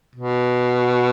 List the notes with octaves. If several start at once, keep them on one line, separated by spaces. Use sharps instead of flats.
B2